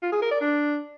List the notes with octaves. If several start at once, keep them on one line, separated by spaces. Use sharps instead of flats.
F4
G#4
A#4
D5
D4